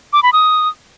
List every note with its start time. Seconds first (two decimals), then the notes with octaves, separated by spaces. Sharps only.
0.13 D6
0.23 B5
0.33 D#6